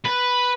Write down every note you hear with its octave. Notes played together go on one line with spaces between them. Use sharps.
B4